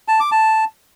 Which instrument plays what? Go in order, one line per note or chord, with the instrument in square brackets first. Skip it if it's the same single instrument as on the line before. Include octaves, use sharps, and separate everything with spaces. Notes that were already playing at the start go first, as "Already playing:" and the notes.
[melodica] A5
D6
A5